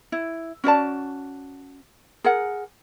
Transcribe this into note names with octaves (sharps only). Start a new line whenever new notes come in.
E4
C#4 F#4 D5 A5
G#4 A#4 F#5